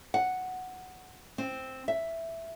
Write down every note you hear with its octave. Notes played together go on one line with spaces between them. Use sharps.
F#5
C4
E5